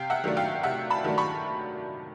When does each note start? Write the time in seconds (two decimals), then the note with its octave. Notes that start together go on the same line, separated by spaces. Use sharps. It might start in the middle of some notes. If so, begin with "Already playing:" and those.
Already playing: C3 F5 G5
0.10 E5 F#5
0.24 D#3 F#3 A3 D4
0.37 F5 G5
0.63 C3 E5 F#5
0.90 A5 B5
1.04 D#3 F#3 A3 D4
1.18 B5 C#6